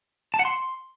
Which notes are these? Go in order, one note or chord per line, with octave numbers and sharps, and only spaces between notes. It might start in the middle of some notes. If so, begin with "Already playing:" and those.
A5
F#5
C6